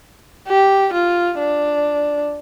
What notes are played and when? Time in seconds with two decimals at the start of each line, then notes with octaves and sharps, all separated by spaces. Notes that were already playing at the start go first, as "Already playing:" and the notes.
0.48 G4
0.93 F4
1.39 D4